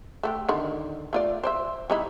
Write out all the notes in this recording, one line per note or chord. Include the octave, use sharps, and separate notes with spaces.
A3 F#4 G4
D3 D#3
A3 F4 D5
C5 D5 E5
G3 D#4 E4